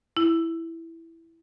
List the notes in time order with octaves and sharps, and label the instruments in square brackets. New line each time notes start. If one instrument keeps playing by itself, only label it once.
[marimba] E4